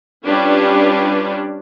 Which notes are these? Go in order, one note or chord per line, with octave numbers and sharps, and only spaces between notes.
G3 C#4 D4 F4 G4 B4